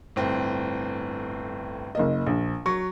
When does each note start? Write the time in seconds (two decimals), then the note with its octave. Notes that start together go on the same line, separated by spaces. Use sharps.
0.16 G1 A2 C4
1.95 F#1 A#3 D#5
2.26 A#1
2.66 F#3 C#6